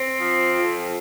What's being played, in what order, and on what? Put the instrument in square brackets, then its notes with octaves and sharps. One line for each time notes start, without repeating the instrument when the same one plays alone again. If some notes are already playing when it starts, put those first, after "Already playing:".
Already playing: [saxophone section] C4
F3
F2